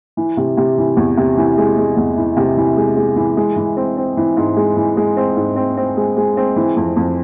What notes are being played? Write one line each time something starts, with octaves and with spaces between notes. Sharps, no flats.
E3
C3
C3
E3
E2
C3
E3
G#3
G#3
E2
E3
C3
E3
G#3
G#3
E3
G#3
E3
C4
C4
E3
G#2
G#3
E3
G#3
C4
G#2
C4
C4
G#3
G#3
C4
E3
F2
F2